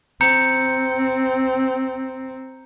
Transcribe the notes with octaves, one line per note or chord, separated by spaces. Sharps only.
C4 A#5 G6 C#7